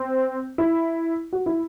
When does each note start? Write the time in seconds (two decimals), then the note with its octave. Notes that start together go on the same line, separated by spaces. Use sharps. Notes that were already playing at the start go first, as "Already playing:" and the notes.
Already playing: C4
0.58 E4
1.33 F#4
1.46 E4